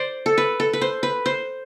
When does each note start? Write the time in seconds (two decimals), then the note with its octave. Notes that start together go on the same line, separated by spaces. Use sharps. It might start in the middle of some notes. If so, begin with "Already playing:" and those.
Already playing: C5 D5
0.26 A4
0.38 B4
0.60 A4
0.73 B4
0.81 C5
1.03 B4
1.26 C5